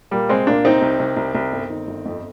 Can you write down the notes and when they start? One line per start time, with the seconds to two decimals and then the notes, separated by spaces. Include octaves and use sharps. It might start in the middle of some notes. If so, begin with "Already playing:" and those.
0.11 A#2 G3 A#3
0.29 C2 G#3 C4
0.47 A#2 A#3 D4
0.65 C2 C4 D#4
0.82 C2
0.99 C2
1.17 C2
1.35 C2
1.52 G1
1.70 D#3
1.87 G1
2.06 F2